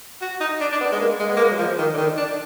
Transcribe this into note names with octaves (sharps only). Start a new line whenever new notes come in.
F#4
D#4
D4
D4
B3
G#3
A#3
G#3
B3
A#3
G#3
F#3
F3
D#3
D3
D#3
D4